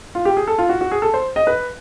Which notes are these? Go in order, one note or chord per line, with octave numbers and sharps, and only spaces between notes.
F4
G4
G#4
A4
F4
F#4
F#4
G#4
A4
C5
D#5
B4